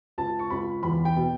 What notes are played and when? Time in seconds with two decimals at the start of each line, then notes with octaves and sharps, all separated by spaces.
0.18 C#2 A5
0.39 C#6
0.50 C#2 B5
0.83 E2 B5
1.05 G5
1.16 B2